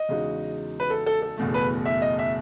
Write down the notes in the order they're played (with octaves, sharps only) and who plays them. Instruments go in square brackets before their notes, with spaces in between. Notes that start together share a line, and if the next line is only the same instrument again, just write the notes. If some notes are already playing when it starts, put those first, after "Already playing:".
Already playing: [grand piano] D#5
[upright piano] E2 C#3 G#3 D#4 F#4
[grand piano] B4
A4
A4
A4
[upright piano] F#1 E2 B2 A3
[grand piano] B4
E5
D#5
E5